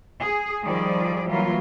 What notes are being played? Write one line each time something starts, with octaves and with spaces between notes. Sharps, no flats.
G#4
D#3 F3 G3 G#4 D5
E3 F#3 G3 A#3 F4